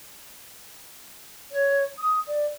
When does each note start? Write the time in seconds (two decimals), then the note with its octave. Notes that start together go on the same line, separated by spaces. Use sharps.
1.52 C#5
1.99 D#6
2.27 D5